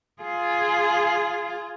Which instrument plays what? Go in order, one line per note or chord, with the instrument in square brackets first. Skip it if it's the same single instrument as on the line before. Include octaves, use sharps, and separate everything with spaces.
[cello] F4 G#4